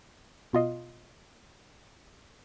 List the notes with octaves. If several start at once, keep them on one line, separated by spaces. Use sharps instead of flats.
B2 F4 D#5 C6